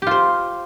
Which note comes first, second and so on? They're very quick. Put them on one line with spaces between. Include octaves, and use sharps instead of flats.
G4 F4 C5